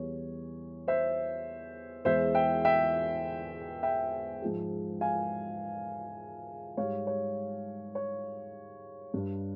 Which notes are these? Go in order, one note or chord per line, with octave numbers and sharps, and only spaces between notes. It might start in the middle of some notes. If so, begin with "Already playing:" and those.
Already playing: E2 E3 G3 C#5
C5 E5
E2 E3 G#3 C5 E5
E5 G5
E5 G5
E5 G5
G#2 F3 G#3
F5 G#5
G#2 G3 C#5 F5
C#5
C#5
G2 G3